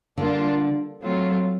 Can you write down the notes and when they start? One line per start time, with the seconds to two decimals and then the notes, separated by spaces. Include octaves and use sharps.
0.17 D3 G3 A#3 D4 F4
1.03 F#3 A3 C4 F4